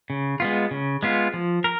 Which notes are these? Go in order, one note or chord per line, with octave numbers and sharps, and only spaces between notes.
C#3
G#3 B3 F4
C#3
G#3 B3 F4
F3
A#4